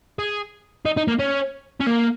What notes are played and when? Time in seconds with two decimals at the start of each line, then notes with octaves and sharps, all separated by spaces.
0.19 G#4
0.86 D#4
0.97 D#4
1.08 A#3
1.19 C#4
1.80 C#4
1.86 A#3